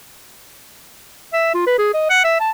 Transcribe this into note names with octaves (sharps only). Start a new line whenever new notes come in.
E5
F4
B4
G#4
D#5
F#5
E5
A5